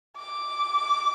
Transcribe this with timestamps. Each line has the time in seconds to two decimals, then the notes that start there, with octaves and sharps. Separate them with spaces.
0.17 D6